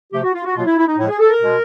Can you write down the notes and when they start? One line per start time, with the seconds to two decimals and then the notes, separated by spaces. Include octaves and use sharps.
0.12 C3 F3 A3 G4
0.22 F#4
0.33 F4
0.44 F#4
0.55 B2 F#3 A#3 F4
0.65 E4
0.76 E4
0.87 D#4
0.98 A2 F3 G#3 E4
1.08 G#4
1.19 A4
1.30 A#4
1.40 B2 G#3